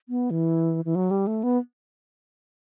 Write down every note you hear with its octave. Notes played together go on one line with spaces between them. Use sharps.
B3
E3
E3
F#3
G3
A3
B3